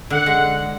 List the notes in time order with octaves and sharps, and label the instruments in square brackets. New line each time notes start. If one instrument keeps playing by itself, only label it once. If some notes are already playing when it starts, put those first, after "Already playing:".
[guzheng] D3 [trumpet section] F#5
[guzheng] G#3